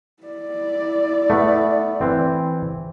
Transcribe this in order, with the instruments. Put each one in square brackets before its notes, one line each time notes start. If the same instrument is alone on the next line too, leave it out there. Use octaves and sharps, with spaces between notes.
[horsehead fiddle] E4 D5
[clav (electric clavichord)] A3 B3
E3 C4